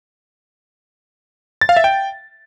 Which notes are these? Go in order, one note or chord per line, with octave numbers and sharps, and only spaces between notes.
A6
F5
E5
G5